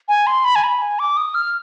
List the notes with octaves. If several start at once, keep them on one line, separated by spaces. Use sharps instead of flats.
G#5
C6
B5
G#5
B5
G#5
D6
D#6
F6